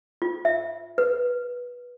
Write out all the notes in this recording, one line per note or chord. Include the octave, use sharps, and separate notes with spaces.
F4
E5
B4